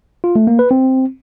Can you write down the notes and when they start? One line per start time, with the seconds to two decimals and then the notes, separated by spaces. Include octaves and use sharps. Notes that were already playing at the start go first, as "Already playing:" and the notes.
0.24 F4
0.36 A3
0.47 A#3
0.59 B4
0.71 C4